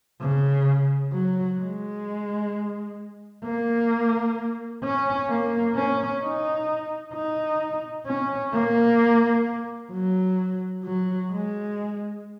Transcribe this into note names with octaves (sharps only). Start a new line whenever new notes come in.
C#3
F#3
G#3
A#3
C#4
A#3
C#4
D#4
D#4
C#4
A#3
F#3
F#3
G#3